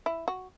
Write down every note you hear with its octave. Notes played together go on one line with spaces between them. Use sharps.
E4
F#4